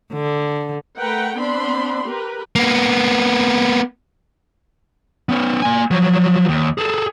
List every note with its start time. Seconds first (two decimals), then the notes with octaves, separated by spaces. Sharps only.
0.13 D3
0.98 A3 A#4 B4 F#5 G5
1.37 B3 C4 D4 B5 C6
2.07 G4 A#4 B4
2.56 A#3 B3
5.29 B3 C#4
5.62 A#3 G#5
5.91 F3 F#3
6.49 D#2
6.78 G#4 A4